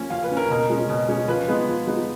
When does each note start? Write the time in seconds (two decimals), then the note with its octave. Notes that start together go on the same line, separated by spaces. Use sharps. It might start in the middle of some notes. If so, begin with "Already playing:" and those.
Already playing: F3 A#3 C#4
0.10 F3 F5
0.23 B4
0.30 A#3 C#4
0.37 A#4
0.50 B2 A#4
0.70 G#3 C#4
0.89 B2
1.08 G#3 C#4
1.28 F3 B4
1.48 G#3 B3 D#4
1.68 F3
1.87 G#3 B3 D#4